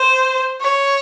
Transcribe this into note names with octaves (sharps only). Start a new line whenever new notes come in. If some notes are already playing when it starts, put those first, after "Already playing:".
Already playing: C5
C#5